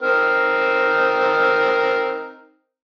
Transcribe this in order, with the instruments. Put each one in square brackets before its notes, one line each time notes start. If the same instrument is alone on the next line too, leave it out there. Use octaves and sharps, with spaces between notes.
[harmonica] C4 D#4 A#4